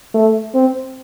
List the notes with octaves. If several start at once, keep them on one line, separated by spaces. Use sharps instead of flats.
A3
C4